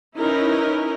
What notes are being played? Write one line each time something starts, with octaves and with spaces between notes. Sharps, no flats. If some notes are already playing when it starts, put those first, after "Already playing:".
C#4 D#4 E4 A#4 B4